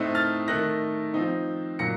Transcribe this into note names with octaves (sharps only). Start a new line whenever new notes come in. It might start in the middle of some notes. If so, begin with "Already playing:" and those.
Already playing: A2 A3 C4 D#4 D#6 F#6
F6 A6
D#3 A3 D#4 F#6 A#6
F3 C4 D#4
A#2 F#3 A#6 C#7